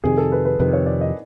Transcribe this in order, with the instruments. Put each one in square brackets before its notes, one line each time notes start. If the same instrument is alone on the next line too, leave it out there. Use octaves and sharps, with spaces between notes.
[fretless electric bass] F2 C3 D#3 [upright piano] G#4
[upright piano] A4
B4
B4
[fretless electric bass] F2 C3 D#3 [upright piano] B4
[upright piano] C#5
D5
D#5